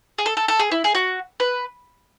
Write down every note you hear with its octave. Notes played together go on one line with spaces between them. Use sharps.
G#4
A4
A4
A4
G#4
E4
G#4
F#4
B4